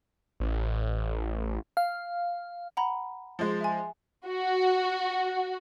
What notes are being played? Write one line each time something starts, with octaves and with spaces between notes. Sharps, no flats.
A1
F5
F#5 A#5 B5
F3 G#3
E5 G#5
F#4